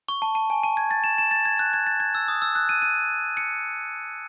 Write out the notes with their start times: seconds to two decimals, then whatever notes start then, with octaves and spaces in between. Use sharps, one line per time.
0.09 C#6
0.22 A5
0.35 A5
0.50 G#5
0.63 A5
0.77 G#6
0.91 A6
1.04 E7
1.18 E7
1.31 A6
1.45 G#6
1.59 F#6
1.73 G#6
1.87 A6
2.00 G#6
2.15 E6
2.28 D#6
2.42 E6
2.55 F#6
2.69 D#7
2.82 D#7
3.37 C#7